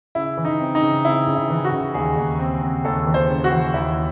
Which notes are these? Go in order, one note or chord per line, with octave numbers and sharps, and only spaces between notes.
C#3 E4
E3
D#4
C4
D#4
C#3
C4 E4
C#3
E4
E3
F#4
C#3
D#2 G#4
D#2
C4
C4
D#2 A4
E3
C5
C#3
F#4
E3
D#2 E4